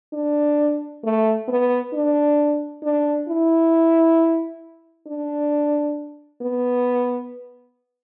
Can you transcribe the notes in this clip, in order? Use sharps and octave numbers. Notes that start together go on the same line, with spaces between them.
D4
A3
B3
D4
D4
E4
D4
B3